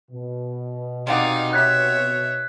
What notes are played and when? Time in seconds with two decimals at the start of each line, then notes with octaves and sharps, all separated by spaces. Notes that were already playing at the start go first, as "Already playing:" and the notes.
0.10 B2
1.07 C3 D#4 D5 F5 F#5
1.53 C#5 E5 F#6 G#6 B6